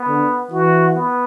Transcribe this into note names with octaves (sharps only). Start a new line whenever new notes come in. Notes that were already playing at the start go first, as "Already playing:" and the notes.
Already playing: B3
D3
E3 F#4
B3